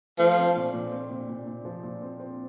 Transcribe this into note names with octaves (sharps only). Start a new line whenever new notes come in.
F3 A3
C4
A#2
A#2
C4
A#2
A#2
A#2
F3
A#2
C4
C4